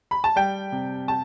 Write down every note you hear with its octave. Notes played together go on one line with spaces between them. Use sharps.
B5
A5
G3 G5
C3
A5